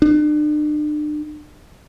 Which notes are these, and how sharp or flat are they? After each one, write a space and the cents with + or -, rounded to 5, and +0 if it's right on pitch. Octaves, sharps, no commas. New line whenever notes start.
D4 +40